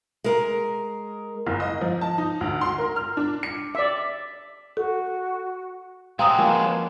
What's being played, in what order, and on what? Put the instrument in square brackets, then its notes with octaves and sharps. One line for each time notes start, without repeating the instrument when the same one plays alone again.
[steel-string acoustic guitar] G#3 A#4
[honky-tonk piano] F#1
D#5
F3
A5
D#4
D2
C6
A#4
F6
D4
C#7
[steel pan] D5 E5
[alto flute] F#4 [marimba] A4
[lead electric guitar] F#3 G#3 [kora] C4 [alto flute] B4 [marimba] F5 A#5 D#6
[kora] F3 A#3 C#4